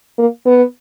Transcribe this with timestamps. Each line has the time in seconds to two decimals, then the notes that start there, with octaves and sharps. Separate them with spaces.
0.18 A#3
0.46 B3